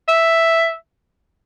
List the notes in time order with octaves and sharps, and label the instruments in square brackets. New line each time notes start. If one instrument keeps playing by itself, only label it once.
[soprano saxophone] E5